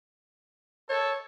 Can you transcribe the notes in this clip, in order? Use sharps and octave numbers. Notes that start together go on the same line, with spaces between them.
A4 C#5